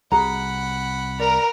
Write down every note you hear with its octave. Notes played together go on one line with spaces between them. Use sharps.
C2 C3 F#4 G#4 F#5 A#5 B5
A#4 D5